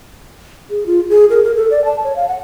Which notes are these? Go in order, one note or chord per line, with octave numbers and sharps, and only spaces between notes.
G#4
F4
G#4
A#4
A#4
A4
D5
A5
C#5
F5
F#5